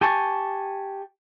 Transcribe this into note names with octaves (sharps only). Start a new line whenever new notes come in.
G4 G#5 A5 C#6